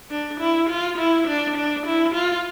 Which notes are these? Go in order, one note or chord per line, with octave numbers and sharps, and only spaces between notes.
D4
E4
F4
E4
D4
D4
E4
F4